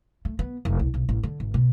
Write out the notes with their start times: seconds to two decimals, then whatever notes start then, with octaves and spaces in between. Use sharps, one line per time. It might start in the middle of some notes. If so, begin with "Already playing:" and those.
0.25 A3
0.39 B3
0.65 F1
0.79 C2
0.94 B1
1.09 A1
1.23 D3
1.40 G#1
1.54 B2